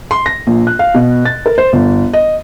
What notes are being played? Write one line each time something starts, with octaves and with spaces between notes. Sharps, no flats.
C6
A#6
A#1
F#6
F5
B2
A6
A#4
C5
G1
D#5